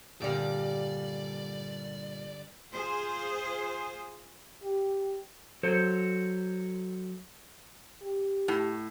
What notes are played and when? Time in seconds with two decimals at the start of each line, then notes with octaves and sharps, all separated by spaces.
0.22 G2 A#2 D3 G3 D5 F5
2.73 F4 G#4 C5
4.64 G4
5.63 F#3 A4 C5
8.03 G4
8.48 A2